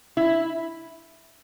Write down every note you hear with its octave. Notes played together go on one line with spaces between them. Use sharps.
E4